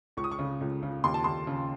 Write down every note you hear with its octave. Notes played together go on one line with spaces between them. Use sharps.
C#2 C#6
D#6
C#6
C#3
C#2
C#3
D#2 C6
A5
D#2 C6
C#3